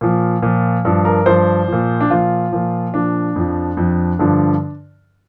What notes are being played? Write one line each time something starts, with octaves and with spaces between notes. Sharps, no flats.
A#2 F3
A#2 F3
G2 F3
A#4
G2 F3 C5
A#2 F3
D4
A#2 F3 F4
A#2 F3
A#2 F3 D4
F2 F3
F2 F3
G2 D3 F3